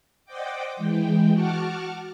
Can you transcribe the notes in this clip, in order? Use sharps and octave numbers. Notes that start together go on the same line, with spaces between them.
C5 D5 D#5 F#5 G5 D6
E3 G#3 G5
F#4 F#5 A5 C#6 D6 F6